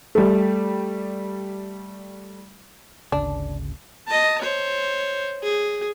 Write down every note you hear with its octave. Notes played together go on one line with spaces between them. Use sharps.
G3 A3
G#1 D2 C#3 D4
D#5 A5
C5 C#5
G#4